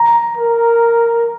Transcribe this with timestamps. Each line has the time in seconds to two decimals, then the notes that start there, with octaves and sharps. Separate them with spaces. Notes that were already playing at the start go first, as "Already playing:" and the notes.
Already playing: A#5
0.37 A#4